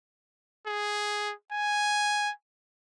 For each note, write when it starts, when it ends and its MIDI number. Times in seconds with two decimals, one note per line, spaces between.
0.67 1.32 68
1.52 2.31 80